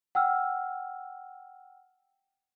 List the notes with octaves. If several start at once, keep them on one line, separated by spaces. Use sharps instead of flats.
F#5 G5 E6 F6